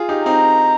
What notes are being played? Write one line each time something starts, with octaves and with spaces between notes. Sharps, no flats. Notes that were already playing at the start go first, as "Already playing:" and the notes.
Already playing: F4 G#4
D#4 G4
C4 D#4 A#5